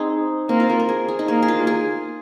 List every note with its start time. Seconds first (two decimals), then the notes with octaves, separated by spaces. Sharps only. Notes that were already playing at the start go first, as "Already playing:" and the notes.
Already playing: C4 D#4 G#4
0.49 A#3 C4
0.60 F4
0.69 A#4
0.80 A#4
0.89 G#4
1.08 G#4
1.19 D#4
1.28 A#3 G#4
1.42 G#4
1.48 F4
1.67 G#4